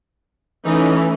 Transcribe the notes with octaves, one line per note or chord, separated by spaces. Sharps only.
E3 A3 C#4 D#4